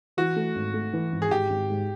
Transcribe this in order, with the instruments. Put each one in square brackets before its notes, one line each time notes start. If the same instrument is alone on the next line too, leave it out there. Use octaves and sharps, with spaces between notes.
[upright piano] E3 [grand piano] F#4
[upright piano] A3
G#1
A3
E3
G#1
[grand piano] G#4
[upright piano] G#1 [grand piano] G4
[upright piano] G#1
G#2